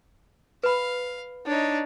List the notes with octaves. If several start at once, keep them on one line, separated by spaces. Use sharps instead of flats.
B4 F5 B5
D4 D#4 C#5